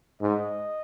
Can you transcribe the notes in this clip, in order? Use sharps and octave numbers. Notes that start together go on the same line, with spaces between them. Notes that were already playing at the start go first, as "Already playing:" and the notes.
G#2 D#5